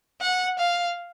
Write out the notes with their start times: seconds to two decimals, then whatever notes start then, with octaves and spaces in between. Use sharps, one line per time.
0.21 F#5
0.59 F5